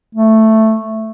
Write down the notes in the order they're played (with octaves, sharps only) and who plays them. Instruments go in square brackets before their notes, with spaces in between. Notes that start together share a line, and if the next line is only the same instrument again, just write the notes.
[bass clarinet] A3